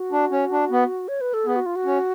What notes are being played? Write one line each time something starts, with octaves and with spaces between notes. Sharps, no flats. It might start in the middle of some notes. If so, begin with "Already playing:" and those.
Already playing: F#4
D4
C#4
D4
B3
C#5
B4
A4
B3 G#4
F#4
F4
F#4
C#4